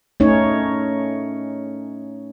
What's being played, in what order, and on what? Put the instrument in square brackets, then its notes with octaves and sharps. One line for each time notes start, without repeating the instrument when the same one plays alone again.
[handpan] A3 C#4 D#4 C#5